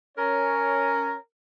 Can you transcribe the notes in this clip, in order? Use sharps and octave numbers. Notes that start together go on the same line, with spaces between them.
C#4 A#4 C#5